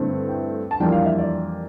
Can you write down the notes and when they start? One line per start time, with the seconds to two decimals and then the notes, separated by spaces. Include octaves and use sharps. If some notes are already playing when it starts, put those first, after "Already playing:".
Already playing: G2 D3 A3 C4 E4
0.29 G5
0.71 A5
0.80 F2 E3 G3 A#3 D4 G5
0.92 F5
1.06 E5
1.18 D5